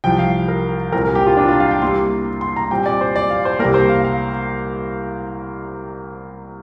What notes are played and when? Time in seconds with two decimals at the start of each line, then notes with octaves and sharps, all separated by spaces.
0.04 C2 C3 F3 G5
0.19 F5
0.48 A#4
0.92 C2 A#2 G3 C4 A#4
1.05 A#4
1.15 G4
1.27 F4
1.37 D4
1.49 F4
1.60 F5
1.71 G5
1.82 C2 C3 A#3 C6
2.41 C6
2.56 A#5
2.71 A#2 G3 C4 G5
2.86 D5
3.01 C5
3.16 D5
3.30 F5
3.45 C5
3.59 C2 C3 A#3 A#4
3.74 C5
3.89 F5
4.05 F5